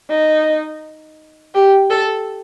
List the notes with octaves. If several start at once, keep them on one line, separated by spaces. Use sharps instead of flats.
D#4
G4
A4